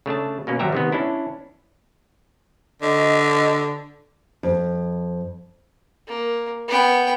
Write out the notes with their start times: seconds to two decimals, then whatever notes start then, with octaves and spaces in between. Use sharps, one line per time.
0.06 C#3 A3 D4 A5
0.47 B2 A#3 C#4
0.59 G#1 F#3 G3 G4 E5 A#5
0.72 C3 D#3 B3
0.92 C#4 D4 E4
2.82 D3 D#5
4.43 F2
6.07 A#3
6.68 B3 G5